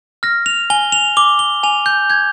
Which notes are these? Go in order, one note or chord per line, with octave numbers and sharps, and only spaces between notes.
F6 A#6
F7
G#5 G7
F7
D6 G7
G7
G#5 F7
G6
G6 G#6